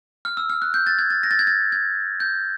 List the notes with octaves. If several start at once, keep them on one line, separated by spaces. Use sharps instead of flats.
F6
E6
F6
F#6
G6
A6
G#6
A6
A#6
A6
G#6
A6
G#6
G6